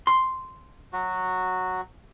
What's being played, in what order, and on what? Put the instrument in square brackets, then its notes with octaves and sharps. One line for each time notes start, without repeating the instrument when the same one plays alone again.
[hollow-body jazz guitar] C6
[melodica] F#3 F#4